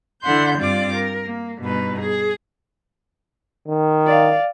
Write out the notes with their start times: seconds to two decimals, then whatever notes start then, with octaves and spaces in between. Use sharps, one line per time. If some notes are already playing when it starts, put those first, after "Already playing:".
0.22 D3 E4 F#5 C6 G6
0.58 G2 C4 F4 D5 D6
0.94 A#4
1.23 A#3
1.59 G2 B2 D#4 B4
1.98 G#4
3.67 D#3
4.07 D5 F5